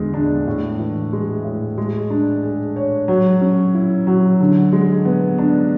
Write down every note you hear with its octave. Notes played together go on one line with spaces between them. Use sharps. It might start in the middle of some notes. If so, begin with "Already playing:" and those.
Already playing: E2 D3 G#3
D4
A2
E3
G#3
A2
G#3
D4
G#4
C#5
F#3
C#4
E4
F#3
D3
G#3
B3
D4